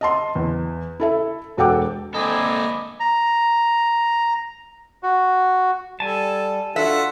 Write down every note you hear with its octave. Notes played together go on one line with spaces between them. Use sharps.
D#5 A5 C6
E2
E4 A4 E5
E1 F#4 A4 F#5 G5 D6
D3 A#3 C4 A4 D#5 G#5 B5 D6
A#5
F#4
G3 A4 G#5 A5
D4 F4 F#4 A4 E5 F#5